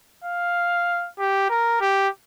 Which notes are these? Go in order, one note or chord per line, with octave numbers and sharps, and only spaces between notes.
F5
G4
A#4
G4